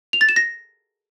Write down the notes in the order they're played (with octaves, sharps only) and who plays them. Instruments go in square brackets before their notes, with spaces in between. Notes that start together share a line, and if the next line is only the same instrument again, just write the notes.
[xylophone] F7
A6
E7
A#6